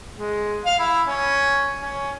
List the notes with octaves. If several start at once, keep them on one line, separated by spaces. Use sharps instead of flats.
G#3
F5
E4
C#4
C#4